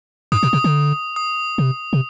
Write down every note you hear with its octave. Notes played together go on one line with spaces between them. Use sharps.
G2 D#6
B2
C3
D3
D#6
C3
C3